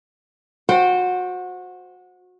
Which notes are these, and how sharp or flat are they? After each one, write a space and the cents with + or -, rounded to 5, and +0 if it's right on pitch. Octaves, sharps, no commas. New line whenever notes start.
F#4 -25 C5 +0 G5 +0